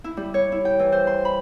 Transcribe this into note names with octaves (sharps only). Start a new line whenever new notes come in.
E4
G3
C#5
E4
G5
E3
C5
C6
B5